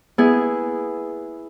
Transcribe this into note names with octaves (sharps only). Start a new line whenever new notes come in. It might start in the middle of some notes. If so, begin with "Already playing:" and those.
B3 E4 G#4